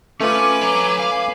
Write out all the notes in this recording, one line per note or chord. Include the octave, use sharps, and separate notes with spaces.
A3 C#4 F4 B4 G#5 D6
C#5 A#5
F5